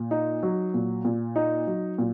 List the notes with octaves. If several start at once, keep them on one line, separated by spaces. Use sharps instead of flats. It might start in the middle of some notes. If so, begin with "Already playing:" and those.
Already playing: A#2
D#4
F#3
A#2
A#2
D#4
F#3
A#2